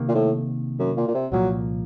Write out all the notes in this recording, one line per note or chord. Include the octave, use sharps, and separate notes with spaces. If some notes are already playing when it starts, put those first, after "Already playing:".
Already playing: C3 D#3 A#3
A#2
A2
F#2
A#2
A#2
C3
C2 A#2 F3 F#3 A#3